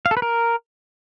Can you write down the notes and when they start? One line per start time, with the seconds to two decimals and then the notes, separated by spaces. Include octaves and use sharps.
0.06 F5
0.11 A4
0.17 B4
0.22 A#4